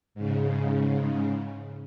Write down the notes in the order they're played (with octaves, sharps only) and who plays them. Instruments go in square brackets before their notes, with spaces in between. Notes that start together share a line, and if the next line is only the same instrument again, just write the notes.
[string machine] G#2 C#3